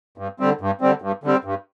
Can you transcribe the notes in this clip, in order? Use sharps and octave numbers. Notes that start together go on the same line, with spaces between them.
G2
D3 G3 C4
G2
D3 G3 C4
G2
D3 G3 C4
G2